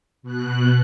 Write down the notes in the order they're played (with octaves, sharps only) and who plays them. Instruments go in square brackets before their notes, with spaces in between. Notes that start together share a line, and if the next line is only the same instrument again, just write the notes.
[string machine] B2 F#6